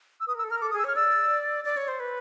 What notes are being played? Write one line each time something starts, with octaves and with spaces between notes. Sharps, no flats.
E6
B4 D#6
A#4
E6
A4
A#4 F6
A4 D6
G#4 D#6
E6
C#5 F6
D5 E6
D5
C#5
C5
B4